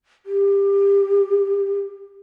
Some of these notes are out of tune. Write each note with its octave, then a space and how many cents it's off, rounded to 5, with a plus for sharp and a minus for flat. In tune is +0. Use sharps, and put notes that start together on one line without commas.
G4 +25